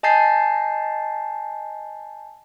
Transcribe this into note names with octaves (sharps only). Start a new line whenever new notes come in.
D#5 G#5 A5 G6 A6 C7